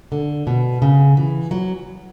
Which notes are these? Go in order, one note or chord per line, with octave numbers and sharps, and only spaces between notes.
D3
B2
C#3
E3
F#3